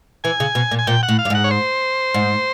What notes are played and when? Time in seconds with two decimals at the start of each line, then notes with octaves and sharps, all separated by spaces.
0.24 E3 G#5
0.40 C#3
0.55 B2
0.71 A#2
0.79 G#5
0.87 A#2 G5
1.03 F#5
1.08 A2
1.19 F5
1.25 G2
1.30 G#2 F#5
1.44 C#5
1.51 C5
2.14 G#2